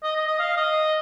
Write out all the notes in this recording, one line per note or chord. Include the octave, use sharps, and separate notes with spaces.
D#5
D#5
D#5
F5
D#5